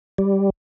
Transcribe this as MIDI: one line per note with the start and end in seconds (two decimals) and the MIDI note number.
0.18 0.50 55